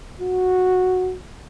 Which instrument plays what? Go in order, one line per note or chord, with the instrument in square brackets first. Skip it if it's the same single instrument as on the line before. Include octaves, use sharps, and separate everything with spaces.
[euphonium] F#4